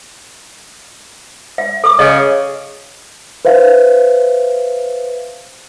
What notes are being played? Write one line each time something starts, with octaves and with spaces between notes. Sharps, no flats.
E5
A4 D6
C#3 D#5
B4 C5 E5 F5